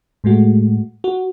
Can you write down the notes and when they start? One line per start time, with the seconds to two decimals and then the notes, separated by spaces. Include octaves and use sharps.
0.24 A2 G#3 A3 F#4
1.04 F#4